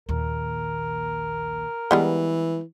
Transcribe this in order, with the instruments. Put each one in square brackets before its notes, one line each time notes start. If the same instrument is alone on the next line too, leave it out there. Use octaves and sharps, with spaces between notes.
[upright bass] A#1 D#2 [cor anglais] A#4
[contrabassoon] E3 [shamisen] G3 G#3 B3 [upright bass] E4